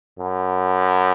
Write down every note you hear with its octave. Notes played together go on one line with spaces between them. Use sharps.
F#2